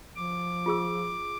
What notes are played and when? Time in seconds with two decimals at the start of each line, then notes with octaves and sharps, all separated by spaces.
0.16 F3 D6
0.66 F4 G#4 E6